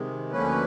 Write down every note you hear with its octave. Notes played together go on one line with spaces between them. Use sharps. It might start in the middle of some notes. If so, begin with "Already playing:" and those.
Already playing: C3 D#3 G#3
D2 D3 F3 A#3 C#4 B4